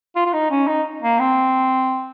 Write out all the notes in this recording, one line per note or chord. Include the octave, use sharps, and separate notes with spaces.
F4
F4
D#4
C#4
D#4
A#3
C4